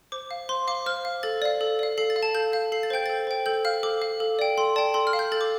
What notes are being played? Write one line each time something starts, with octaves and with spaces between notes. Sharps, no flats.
C5 D6
F5
C5 C6
F5 D6
C5 F6
F5
A4 A6
D5 F5
A4
D5 F5
A4 C7
A6
F5
A5
A4 G6
F5
A4 C7
A6
C5 G5 G6
A4 A6
C5 G5
A4 G6
F5 F6
A4 D6
F5
A4
D5 G5
A4 C6
D5 G5 A5
A4 C6
F6
F5
G6
A4 A6
D6